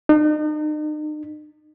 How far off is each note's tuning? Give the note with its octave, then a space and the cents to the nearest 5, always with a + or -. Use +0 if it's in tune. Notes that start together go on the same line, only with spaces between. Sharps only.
D#4 -40